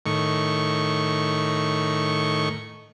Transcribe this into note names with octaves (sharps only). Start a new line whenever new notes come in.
A2 D#3 C#6